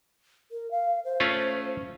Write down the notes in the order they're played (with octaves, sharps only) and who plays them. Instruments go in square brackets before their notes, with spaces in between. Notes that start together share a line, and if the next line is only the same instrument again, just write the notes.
[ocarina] A#4
F5
C5
[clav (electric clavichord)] A3 C#4 F4